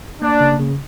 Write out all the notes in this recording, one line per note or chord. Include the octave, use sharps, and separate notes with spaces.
A#3 D4
C#3
C#3